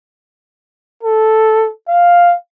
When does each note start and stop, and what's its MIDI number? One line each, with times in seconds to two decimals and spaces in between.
1.03 1.70 69
1.88 2.34 77